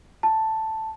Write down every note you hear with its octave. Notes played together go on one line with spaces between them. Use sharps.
A5